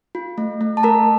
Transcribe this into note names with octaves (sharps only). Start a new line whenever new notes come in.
F4
A3
A3
A5
A3 A#4 A#5